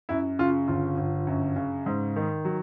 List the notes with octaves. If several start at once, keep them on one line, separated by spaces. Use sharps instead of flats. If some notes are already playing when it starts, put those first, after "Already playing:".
F#2 E4
C#3 F4
G1 F4
G1
F#2
C#3
G#2
D#3
F#3